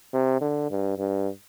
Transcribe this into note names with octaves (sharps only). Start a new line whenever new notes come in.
C3
D3
G2
G2